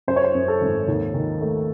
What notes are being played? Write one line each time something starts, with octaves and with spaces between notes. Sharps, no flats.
F#2 C5
C#5
C5
F#2
A4
G#1
D#2
D#3
A3